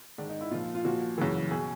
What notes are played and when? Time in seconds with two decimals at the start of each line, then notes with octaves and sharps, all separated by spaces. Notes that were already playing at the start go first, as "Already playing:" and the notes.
0.18 G#2 D#3 D4
0.29 D#4
0.41 E4
0.51 A#2 F3 F4
0.75 F4
0.85 A#2 F3 F#4
1.18 F#2 C#3 E3
1.51 B2 G#4